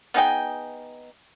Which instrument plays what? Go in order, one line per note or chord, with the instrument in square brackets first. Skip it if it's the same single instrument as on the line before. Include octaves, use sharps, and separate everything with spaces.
[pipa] B3 D#4 G#4 G5